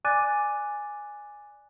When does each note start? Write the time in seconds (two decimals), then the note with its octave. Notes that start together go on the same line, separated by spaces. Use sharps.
0.05 D5 G#5 D6 F#6 A6 D#7